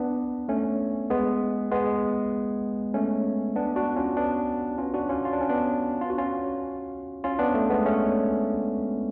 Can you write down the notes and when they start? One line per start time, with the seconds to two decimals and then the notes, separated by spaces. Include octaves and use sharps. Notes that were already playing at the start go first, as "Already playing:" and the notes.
Already playing: B3 D4
0.49 A3 C#4
1.10 G#3 B3
1.71 G#3 B3
2.94 A3 C#4
3.56 B3 D4
3.76 D4 F#4
3.96 C#4 F4
4.17 B3 D4
4.78 C#4 F4
4.94 D4 F#4
5.09 C#4 F4
5.25 F4
5.33 D4
5.41 C#4
5.49 B3 D4
6.01 F4
6.10 F#4
6.18 C#4 F4
7.24 C#4 F4
7.39 B3 D4
7.54 A3
7.70 G#3 B3
7.85 A3 C#4